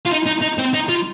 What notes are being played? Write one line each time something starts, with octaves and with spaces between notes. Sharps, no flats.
F4
D#4
D#4
D#4
C4
D#4
F4